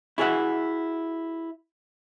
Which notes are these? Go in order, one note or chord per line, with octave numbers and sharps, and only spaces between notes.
E4 F#4 G#4 A#4 E5 F#5